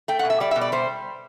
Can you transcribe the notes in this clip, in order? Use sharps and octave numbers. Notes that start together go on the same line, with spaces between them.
A3 G5
F#5
B2
E5
G3 D5
B2 E5
D5
G3 C5